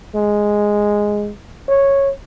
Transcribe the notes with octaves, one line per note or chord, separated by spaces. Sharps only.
G#3
C#5